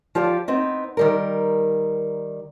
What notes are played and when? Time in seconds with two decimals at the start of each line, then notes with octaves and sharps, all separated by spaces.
0.15 F3 F4 G4 D5
0.48 B3 C4 D#4
0.97 D#3 G3 A#4